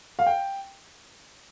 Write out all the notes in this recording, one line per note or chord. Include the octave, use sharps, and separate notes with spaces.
F5
G5